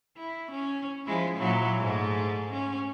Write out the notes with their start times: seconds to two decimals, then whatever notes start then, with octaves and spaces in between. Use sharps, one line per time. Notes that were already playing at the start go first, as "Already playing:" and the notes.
0.17 E4
0.51 C#4
1.06 F3 G#3 E4
1.38 A#2 F#3 E4
1.78 G#2 G#3 A3
2.52 C#4